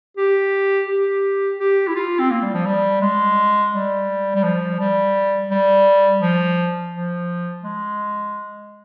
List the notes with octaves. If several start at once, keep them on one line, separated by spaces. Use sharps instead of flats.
G4
G4
G4
E4
F4
C4
A#3
G3
F3
G3
G#3
G3
G3
F3
G3
G3
F3
F3
G#3